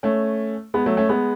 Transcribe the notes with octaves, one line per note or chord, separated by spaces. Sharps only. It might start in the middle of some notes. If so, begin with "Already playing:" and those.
A3 C#4
G#3 B3
F#3 A3
A3 C#4
G#3 B3